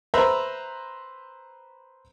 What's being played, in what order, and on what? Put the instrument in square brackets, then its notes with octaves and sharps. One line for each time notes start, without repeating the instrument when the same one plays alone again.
[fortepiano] B4 C5 E5 A#5 B5